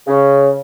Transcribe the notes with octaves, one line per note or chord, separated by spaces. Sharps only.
C#3